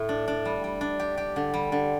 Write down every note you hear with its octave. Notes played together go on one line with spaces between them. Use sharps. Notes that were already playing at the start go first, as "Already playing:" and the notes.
Already playing: A2
D4
D4
G3
G3
D4
G4
G4
D3
G3
D3